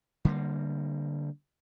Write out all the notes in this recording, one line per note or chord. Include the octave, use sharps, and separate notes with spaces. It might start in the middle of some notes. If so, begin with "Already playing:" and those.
D3 G3 A#3